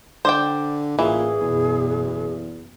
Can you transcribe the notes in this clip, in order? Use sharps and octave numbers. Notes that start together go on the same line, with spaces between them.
D3 C5 D5 G5
A1 A#2 E3 G#4
F#1 E2 B2